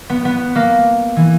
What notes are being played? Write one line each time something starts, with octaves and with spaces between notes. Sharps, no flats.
B3
B3
A#3
E3